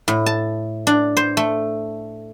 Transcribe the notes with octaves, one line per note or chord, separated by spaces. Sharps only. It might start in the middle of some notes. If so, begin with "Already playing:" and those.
A2
A5
D4
C5
A3